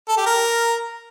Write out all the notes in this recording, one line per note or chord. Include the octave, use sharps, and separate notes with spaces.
A4
G4
A#4